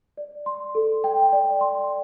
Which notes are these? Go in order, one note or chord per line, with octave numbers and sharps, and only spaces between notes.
D5
C6
A4
G5
D5
C6